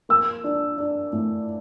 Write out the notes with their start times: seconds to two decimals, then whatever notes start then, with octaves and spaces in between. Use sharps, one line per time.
0.09 A#3 E6
0.44 D4
0.78 D4
1.13 A2